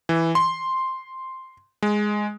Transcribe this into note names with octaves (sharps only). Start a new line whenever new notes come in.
E3
C6
G#3